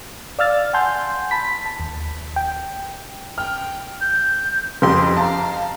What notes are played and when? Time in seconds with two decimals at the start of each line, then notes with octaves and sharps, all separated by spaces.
0.39 D5 F5 E6 F6 A6
0.73 F#5 G#5 A5 C6 G6
1.31 A5 B5 B6
1.66 A5
1.80 D#2
2.36 G5
3.38 G5 F6
4.01 G6
4.82 F#1 F2 G4 C6
5.17 F5 A5 A#5